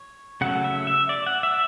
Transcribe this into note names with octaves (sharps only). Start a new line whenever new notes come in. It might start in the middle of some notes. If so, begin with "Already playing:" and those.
Already playing: C#5
C#3 F#3 A3 F#5
E5
E5
D5
F#5
E5